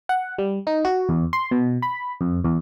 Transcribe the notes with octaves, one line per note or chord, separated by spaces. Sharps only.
F#5
G3
D#4
F#4
E2
C6
B2
B5
F2
E2